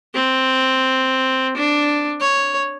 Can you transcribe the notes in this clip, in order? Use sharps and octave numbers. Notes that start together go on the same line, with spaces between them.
C4
D4
C#5